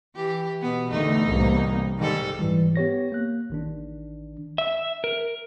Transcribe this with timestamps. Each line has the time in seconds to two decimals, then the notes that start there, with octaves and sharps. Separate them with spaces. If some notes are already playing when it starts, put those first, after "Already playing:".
0.15 E3 G4
0.61 B2 B3
0.91 E2 D3 D#3 A3 D#4
1.25 C2 A2 A#3
1.98 G#2 D#3 G3 A4
2.39 G#2 E3 G3
2.76 B3 G4 C#5 A#6
3.12 A#3 F#6
3.50 A1 D#3 D4
4.58 E5
5.04 A#4